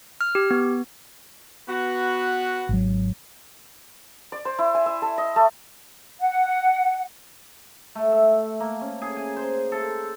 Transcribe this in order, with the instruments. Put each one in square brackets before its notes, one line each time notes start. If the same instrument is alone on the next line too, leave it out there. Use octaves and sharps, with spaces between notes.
[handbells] F6
G4
B3
[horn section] B3 F#4
[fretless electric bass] G#1 F#3
[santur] D5
C5
E4
G#5
E5
A4
D#5
A3
[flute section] F#5
[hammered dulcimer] A3
E5
A#3
C#4
G#4
G#5
C5
A4